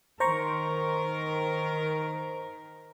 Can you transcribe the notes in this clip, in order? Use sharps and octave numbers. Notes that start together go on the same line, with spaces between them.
D#3 A#4 C5 A#5 C#6